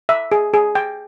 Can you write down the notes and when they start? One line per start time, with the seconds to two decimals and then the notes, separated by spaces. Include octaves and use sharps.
0.09 E5
0.32 G#4
0.54 G#4
0.75 G5